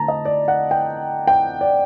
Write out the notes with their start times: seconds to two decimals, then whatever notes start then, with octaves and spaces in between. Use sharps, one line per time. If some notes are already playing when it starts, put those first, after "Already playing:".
Already playing: D3 A3 C4 A5 A#5
0.08 D#5
0.25 D5
0.48 F#5
0.71 G5
1.27 G5
1.61 D5